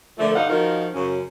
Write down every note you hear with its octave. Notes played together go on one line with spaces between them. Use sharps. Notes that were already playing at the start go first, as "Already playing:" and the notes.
A#2 D3 F3 A3
G2 D3 D#4 F5 F#5
D#3 F3 D#4 F4 F#4 A#4
F#2 C#3 C#4